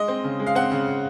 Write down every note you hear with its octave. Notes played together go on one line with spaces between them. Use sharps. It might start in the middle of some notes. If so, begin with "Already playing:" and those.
Already playing: G#3 D#5
C4
C#3
G#3
F5
C4 F#5
C#3